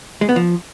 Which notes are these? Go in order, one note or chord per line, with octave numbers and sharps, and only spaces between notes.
G#3
B3
F3